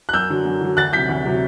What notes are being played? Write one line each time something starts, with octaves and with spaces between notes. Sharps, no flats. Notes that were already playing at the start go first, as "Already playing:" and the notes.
F#6
F#2 E6 G6
D3 F#3
F#2
D3 F#3
D2 F#6 A6
C3 F#3 G6 B6
D2
C3 F#3